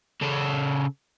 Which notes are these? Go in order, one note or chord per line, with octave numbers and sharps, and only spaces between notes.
C#3 A4